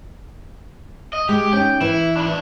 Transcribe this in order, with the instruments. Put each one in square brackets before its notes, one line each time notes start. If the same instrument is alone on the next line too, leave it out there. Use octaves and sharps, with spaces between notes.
[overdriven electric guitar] D#5
[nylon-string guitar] G#3 [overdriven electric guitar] G4
[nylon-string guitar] C#4 D#4 [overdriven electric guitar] G5
[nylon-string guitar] E3 [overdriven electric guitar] E4
[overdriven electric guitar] D4 B5